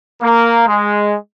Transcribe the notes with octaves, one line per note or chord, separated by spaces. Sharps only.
A#3
G#3